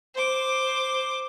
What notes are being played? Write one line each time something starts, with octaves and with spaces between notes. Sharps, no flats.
C5 D6